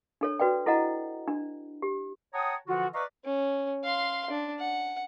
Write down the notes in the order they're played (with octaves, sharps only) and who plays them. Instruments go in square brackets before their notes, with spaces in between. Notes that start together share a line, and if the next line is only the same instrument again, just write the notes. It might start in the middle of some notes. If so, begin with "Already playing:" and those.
[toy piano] D4 A4 C#5
F#4 B4 D5 G5
E4 A4 D#5 F#5 A#5
D4
G4
[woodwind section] C#5 F#5 G5 A5 A#5 D#6
D3 E3 F3 F4 F#4
B4 D5 D#5 F5 A#5 C#6
[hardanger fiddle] C#4
F5 C6
D4
F#5